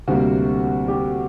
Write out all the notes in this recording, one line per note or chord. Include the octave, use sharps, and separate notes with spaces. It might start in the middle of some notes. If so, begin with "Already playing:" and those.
D2 C3 G3 A#3 F#4
G4